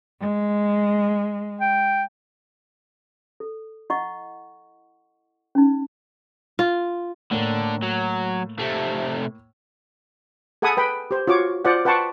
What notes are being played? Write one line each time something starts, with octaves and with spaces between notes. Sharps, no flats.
G#3
G5
A4
E4 D#5 F#5 C#6
C#4 D#4
F4
A2 D3 A#3
F#3
C3 A3
G#4 A4 F#5 G#5 B5 D#6
B4 G5 B5
G4 C5
F4 F#4 C#5 D6
F4 C5 D5 F#5
B4 F#5 G5 A5 C6 C#6